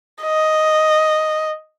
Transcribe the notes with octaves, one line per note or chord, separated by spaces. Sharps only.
D#5